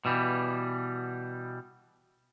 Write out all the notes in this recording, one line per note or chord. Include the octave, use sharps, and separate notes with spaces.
B2 E3 G3